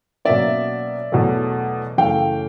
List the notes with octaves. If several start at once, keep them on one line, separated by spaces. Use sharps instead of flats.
B2 F#3 A#3 C#4 D5 E5
E2 B2 F#3 A3
F#2 C#3 E3 A3 F5 G5